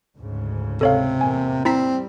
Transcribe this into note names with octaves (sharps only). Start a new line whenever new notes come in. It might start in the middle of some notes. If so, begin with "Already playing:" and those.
D2 G#2 C#3
C3 A4 C#5 F5
E2 A2 A#3 G#5
G3 C4 E4 A#5 B6